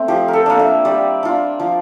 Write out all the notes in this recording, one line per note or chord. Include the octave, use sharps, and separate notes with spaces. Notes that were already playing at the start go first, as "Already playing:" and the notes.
Already playing: A3 C4
F3 G4
A#4
A4
A#3 D4
E5
G3 D5
D4 F4
F3